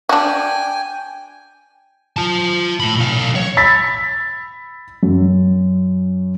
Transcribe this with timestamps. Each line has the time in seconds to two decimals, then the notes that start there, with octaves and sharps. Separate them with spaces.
0.09 D4 F#4 G5 G#5
2.17 F4 A5
2.80 A2 B5
2.96 B1 F5
3.35 C#5
3.57 B5 E6 A6 B6
5.03 F#2